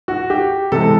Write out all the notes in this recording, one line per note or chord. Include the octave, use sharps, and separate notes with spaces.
F#4
G4
C3 E3 G#3 A4